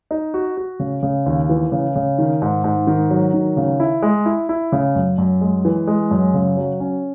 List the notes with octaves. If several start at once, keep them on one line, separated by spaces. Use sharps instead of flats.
D#4
F#4
F#4
C#3
C#3
D#2
E3
C#3
C#3
D#3
G#2
G#2
D#3
F#3
D#3
C#3
E4
G#3
E4
E4
C#3
F#2
F#2
G#3
E3
G#3
F#2
C#3
F#3
C#4